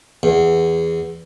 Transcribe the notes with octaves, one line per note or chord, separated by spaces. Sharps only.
E2